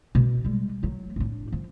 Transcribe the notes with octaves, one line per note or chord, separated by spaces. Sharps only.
B2
G3 G#3
F#3 A3
A2 D4
F3